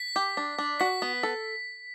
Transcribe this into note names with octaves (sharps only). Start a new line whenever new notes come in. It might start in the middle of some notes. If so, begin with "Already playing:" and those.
Already playing: B6
G4
D4
D4
F#4 B6
B3
A4